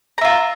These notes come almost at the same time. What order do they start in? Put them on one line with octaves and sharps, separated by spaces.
A#5 E5 F4